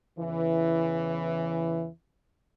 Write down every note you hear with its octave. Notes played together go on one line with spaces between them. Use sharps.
E2 C#3 E3